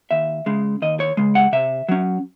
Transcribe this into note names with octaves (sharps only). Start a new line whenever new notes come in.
D#2 E5
C#3 G#3
D#2 D#5
C#5
C#3 G#3
F#5
C3 E5
F#3 C#4